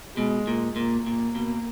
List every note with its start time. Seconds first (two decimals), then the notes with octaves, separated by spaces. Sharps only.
0.17 B2 G#3
0.47 A#2
0.76 A#2 A#3
1.06 A#2
1.35 B2